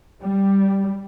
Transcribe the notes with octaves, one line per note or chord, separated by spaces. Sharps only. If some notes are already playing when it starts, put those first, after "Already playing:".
G3